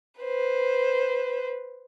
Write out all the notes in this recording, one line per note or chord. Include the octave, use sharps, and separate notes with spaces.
B4 C5